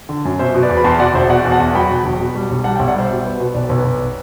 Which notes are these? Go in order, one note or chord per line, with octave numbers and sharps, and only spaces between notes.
D3
F#2
B2 C5 E5
B2
B4 D5
E2
B5
E2 A5 C6
B2 D5 F#5
E1 C5 E5
B2 D5 F#5
E2
F#5 A5
E2
F#3 G5 B5
B2
E1
B2
G3
B1
G3 F#5 A5
B1 E5 G5
D5 F#5
G3 C5 E5
B2
B3
B2
B1 B4 D5
B1
B4
B1